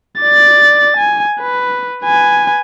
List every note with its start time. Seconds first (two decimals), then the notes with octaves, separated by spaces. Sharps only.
0.21 D5 A6
0.97 G#5
1.40 B4
2.03 B4 G#5